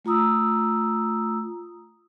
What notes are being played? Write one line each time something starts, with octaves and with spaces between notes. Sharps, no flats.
A3 F4 A#5 D#6 E6